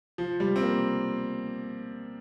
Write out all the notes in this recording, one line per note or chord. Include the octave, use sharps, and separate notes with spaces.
F3
G3
C4
A#3